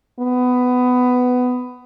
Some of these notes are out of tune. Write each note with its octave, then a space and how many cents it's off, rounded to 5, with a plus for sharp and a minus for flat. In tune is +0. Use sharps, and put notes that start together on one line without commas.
B3 +15